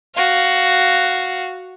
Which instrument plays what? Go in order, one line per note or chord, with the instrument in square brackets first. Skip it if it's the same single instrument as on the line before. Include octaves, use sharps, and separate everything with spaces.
[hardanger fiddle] F#4 F5